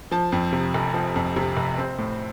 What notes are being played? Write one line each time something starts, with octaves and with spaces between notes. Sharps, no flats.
F3 A5
F2
C3
F1
F3
F2
C3
F1
C4
A2